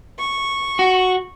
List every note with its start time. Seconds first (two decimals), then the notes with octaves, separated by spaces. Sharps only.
0.19 C#6
0.79 F#4